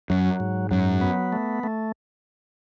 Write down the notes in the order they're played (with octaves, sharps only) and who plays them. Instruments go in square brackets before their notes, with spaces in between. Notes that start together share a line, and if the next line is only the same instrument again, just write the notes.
[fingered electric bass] F#2 [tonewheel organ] F#3
[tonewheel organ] G#2
[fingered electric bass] F#2 [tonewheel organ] F#3
[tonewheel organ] B3
A3
A3